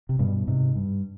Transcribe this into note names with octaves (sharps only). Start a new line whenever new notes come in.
C3
G2 B2
G#2 C3
G2